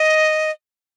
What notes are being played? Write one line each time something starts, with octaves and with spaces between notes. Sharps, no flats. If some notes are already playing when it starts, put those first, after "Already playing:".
Already playing: D#5